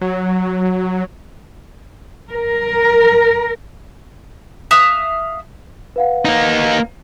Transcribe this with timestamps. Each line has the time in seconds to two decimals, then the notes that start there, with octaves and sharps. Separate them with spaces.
0.01 F#3
2.30 A#4
4.71 E5 F5 D#6 F#6
5.96 B4 F5 F#5
6.25 A#3 D#4